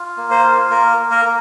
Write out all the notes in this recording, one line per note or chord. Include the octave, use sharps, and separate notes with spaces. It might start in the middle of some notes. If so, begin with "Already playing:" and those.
Already playing: F4
A#3
C5
F4
A#3 A#4
A#3
A#4
A#3